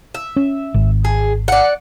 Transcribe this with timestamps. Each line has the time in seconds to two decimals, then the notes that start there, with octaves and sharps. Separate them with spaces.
0.15 E5
0.36 C#4
0.74 G#1
1.05 G#4
1.48 D5 F#5